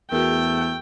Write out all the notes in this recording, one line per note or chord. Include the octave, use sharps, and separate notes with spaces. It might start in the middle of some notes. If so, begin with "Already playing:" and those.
E2 A3 F#4 G#4 A#4 G5